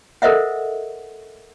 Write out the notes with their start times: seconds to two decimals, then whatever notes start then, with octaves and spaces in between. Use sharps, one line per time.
0.22 A4 A#4 C5 D#5 E5 F#5